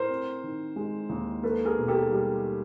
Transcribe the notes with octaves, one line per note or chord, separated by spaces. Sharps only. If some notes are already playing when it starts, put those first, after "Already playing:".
Already playing: A2 A#4 C5
C4
D#3
G#3
D#2
A#3 A4 B4
G#4 A#4
B2
G4 A4
G3